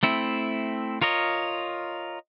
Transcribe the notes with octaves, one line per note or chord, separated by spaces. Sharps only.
A3 C4 E4
F4 A#4 C#5 D#5